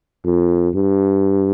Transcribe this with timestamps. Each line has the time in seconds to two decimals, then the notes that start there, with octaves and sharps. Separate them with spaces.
0.25 F2
0.75 G2